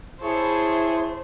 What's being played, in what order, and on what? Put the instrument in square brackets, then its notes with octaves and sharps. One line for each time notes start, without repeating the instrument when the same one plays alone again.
[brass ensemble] E4 G#4 [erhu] C5 [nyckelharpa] C#5 A5